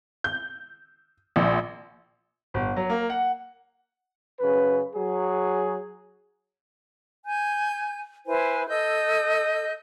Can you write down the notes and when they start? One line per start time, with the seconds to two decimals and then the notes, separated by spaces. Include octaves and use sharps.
0.24 G6
1.36 A#1
2.54 G1
2.76 F#3
2.90 A#3
3.10 F#5
4.40 F#2 C#3 B4
4.95 F#3 G#4
7.25 G#5 G6
8.26 E4 B4 C5 G#5
8.68 A4 D#5 E6 G6